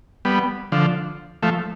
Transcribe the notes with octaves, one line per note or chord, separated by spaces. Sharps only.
G3 B3
D3 F3
F3 A3